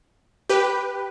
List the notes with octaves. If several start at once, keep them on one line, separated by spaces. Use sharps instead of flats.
G4 B4